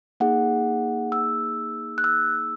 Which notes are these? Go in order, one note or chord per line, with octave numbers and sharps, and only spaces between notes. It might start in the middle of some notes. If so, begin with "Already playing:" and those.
A#3 D#4 G#4 F#5
E6
F#6
E6